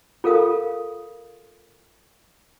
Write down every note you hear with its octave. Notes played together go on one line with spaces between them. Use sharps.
F4 A4 A#4 F5 D#6